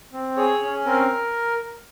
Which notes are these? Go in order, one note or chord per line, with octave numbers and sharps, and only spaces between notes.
C4
G#4 C#5
C#4
C4 A#4